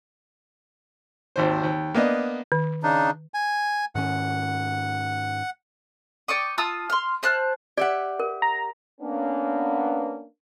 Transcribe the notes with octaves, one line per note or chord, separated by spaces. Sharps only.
G#1 D#2 C5
D#2
A#3 B3 D4 D#5
D#3
C#3 D4 D#4
G#5
G#2 D#3 C#4 F#5
D5 G5 C#6 D#6
F4 A5 D#6 E6
C6 F6
C5 A5 F6 F#6
G4 D5 E5 F#5
A#4
A#5
A#3 B3 C#4 D4